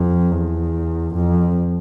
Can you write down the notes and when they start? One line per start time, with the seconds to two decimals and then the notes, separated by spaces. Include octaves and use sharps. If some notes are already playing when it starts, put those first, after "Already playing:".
Already playing: F2
0.32 E2
1.14 F2